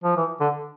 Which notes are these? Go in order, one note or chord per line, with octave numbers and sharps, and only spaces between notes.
F3
E3
D3